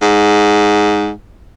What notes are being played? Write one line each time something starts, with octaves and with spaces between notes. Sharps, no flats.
G#2